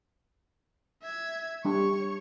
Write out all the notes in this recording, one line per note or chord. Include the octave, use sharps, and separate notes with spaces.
E5 G#6
G3 D4 C#5 C#6